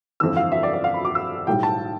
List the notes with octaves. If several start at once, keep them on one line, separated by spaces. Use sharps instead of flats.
G1 F2 E3 E6
F5
E5
D5
D5
F5
B5
D6
E6
B1 A2 G3 G5
A5